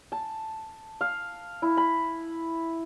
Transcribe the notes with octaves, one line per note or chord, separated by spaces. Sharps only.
A5
F5
E4
B5